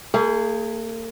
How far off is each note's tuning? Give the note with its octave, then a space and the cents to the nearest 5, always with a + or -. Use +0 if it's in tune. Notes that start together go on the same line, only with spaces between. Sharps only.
A#3 -45 G#4 +5 B4 +0